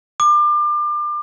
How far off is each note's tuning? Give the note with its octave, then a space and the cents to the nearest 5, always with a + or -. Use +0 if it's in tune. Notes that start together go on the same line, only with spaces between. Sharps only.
D6 +30